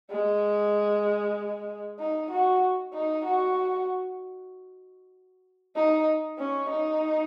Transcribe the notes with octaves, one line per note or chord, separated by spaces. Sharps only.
G#3
D#4
F#4
D#4
F#4
D#4
C#4
D#4